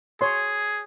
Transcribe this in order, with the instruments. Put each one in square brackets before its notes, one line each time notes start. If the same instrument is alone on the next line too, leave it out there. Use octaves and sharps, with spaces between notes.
[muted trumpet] G#4 [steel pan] C#5 C6